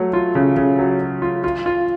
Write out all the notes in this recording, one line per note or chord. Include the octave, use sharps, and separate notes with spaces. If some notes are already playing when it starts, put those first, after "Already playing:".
Already playing: F#3 A3
F4
C#3
C#3
F#3
F#3
F4
F4
F4